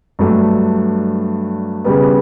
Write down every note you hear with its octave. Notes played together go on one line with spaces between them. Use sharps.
G2 F#3 A3 D4
C#3 G3 B3